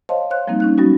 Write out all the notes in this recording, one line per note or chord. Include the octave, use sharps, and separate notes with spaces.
C5 C#5 D#5 F5 A5 C6
C5 C#5 F5 C6 F#6
F3 G3 A#3 C4 D#4
C#4 D#4 F#6
F#3 G3 B3 C#4 D#4 F#4